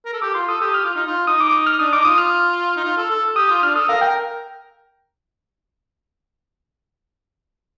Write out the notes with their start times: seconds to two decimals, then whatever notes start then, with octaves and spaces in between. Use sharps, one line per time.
0.05 A#4
0.13 A4
0.22 G4 D6
0.35 F4 C6
0.48 A4 D#6
0.61 G4 D#6
0.74 G4 F6
0.85 F4
0.95 D#4
1.07 F4
1.27 D#4 D#6
1.40 D6
1.52 D#6
1.66 F6
1.79 D4 D#6
1.93 D#4 D6
2.05 F4 D#6
2.18 F6
2.76 D#4
2.84 F4
2.97 A4
3.10 A4
3.36 G4 D#6
3.49 F4 D#6
3.62 D4 F6
3.75 A4 D#6
3.88 A#4 F5
4.01 A#4 G5